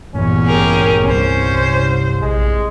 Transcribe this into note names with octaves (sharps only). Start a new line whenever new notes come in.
A1 E2 G2 A#2 C#4
G4 G#4 A#4
C2 C#4 C5
A#1 G#3